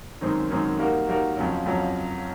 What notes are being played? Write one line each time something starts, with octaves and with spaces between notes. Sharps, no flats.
F#2 D#3 G#3 C4 D#4
F#2 D#3 G#3 C4 D#4
G3 A#3 D#4 F#4 A#4
G3 A#3 D#4 F#4 A#4
F2 C#3 F#3
F2 C#3 F#3